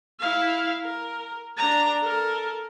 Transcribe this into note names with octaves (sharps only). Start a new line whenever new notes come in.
E4 F5
A#4
D4 A#5
A4 A#4